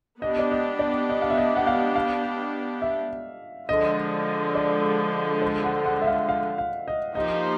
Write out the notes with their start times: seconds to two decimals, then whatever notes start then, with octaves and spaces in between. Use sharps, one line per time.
0.22 B3 D4 G4 D#5
0.39 D5
0.51 D#5
0.79 D5
1.09 D#5
1.22 F5
1.30 E5
1.38 D#5
1.57 F#5
1.67 F5
1.95 F5
2.82 E5
3.69 D3 F3 G#3 D#5
4.55 D5
5.42 C5
5.64 F#5
5.85 F#5
6.02 E5
6.07 F5
6.29 F5
6.58 F5
6.88 D#5
7.15 F3 A#3 D#4 G4 C5 D#5